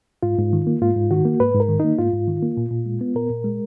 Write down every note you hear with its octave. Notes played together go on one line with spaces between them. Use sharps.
G#2 F4
G#2
D#3
A#3
G#2 F4
G#2
D#3 F#4
A#3
G#2 B4
G#2
A#4
D#3
A#3 D#4
G#2 F4
G#2
D#3
A#3
A#2
A#2
G#3
B3
A#2 A#4
A#2
G#3